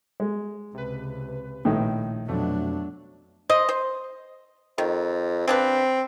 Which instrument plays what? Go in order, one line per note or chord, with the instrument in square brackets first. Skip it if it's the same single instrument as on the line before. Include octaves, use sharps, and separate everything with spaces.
[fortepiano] G#3
[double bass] C#2 [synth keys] C3 B4
[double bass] A#1 [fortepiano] A2 D#3
[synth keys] F2 B2 A3 [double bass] F#3 D4
[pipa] C5 D#5
C5
[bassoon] F2 [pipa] D#3
[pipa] C#3 D4 B4 [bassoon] C4